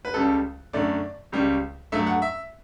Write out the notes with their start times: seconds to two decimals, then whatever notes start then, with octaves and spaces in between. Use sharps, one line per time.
0.05 B4
0.14 C#2 C#3 G3 A4
0.73 F#2 D3 A3 D5
1.32 C#2 C#3 G3
1.92 G2 F#3 A3 E5
2.07 F#5
2.22 E5